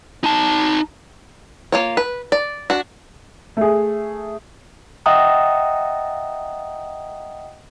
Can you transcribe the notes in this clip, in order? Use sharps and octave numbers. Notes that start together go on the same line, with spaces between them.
D#4 A5
A#3 F4 C#5
B4
D5
D4 F#4
A3 G#4
D#5 E5 F#5 G5 A#5 D#6